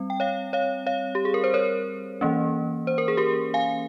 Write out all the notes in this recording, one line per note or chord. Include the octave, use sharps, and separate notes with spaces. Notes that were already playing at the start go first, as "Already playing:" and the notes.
Already playing: G3 C4
G5
C#5 F5
C#5 F5
C#5 F5
G4
G#4
A#4
C5
A#4 C#5
E3 A#3 C#4
C5
A#4
G#4
G4 A#4
F5 G#5